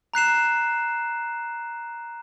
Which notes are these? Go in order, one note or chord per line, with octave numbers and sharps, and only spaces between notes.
A#5 F#6 C7 E7